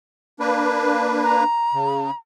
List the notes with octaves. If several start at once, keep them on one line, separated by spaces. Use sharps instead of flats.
A#3 D4 B4
A#5
C#3